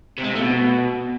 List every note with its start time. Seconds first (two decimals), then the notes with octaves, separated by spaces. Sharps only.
0.18 C3
0.24 G#3
0.29 C3
0.35 A3
0.40 B2